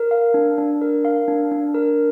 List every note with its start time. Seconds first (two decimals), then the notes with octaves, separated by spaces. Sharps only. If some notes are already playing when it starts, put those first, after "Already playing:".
Already playing: A#4
0.11 F5
0.34 D4
0.58 D4
0.82 A#4
1.05 F5
1.28 D4
1.51 D4
1.74 A#4